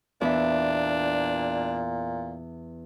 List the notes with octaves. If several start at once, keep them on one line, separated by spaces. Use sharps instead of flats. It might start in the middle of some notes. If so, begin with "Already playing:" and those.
E2 A#2 B3 D4 E5